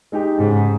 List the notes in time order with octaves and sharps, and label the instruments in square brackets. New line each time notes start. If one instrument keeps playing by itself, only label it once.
[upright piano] G#3 D#4 G4
[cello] G#2 [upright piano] C#3